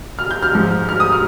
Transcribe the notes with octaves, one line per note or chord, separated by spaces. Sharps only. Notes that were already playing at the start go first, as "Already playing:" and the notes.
F6
G6
F6
G#2 F3 G#3
F6
D#6
F6